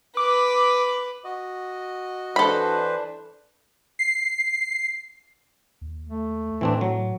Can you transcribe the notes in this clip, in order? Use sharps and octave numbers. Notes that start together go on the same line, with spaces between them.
B4 D6
F#4 D#5
E3 D4 A4 B4 C5 B5
C7
D#2
A3
A2 E3 C4 D4
F#3